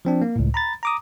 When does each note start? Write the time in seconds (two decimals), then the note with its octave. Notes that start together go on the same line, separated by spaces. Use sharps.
0.05 F3 C4 D4
0.22 A#3
0.36 C#2 A2
0.54 A#5 B5 A6
0.83 A#5 D6 D#6